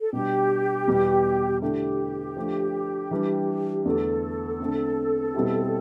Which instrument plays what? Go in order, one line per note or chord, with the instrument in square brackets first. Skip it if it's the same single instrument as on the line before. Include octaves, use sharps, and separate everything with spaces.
[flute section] A4
[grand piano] B2 G3 D4 [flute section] G4
[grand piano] E2 B2 G3
[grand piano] D3 A3 E4 A4 [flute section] G4
[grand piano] F3 A3 D4
E3 G3 D4
[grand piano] E2 D3 A3 [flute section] A4
[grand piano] D3 A3 C4
B2 G3 C4 E4 G4